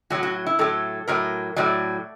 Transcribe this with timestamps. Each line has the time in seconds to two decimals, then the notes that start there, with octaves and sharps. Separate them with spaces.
0.10 A2 F#3 F#4
0.23 F#4
0.47 E4
0.59 A2 F#3 A4
1.08 A2 F#3 A#4
1.56 A2 F#3 D5